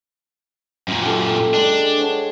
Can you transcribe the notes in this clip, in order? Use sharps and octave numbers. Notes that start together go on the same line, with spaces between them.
F#2 A#2 C6
G4 A4
G#3 D4
C#5 F#5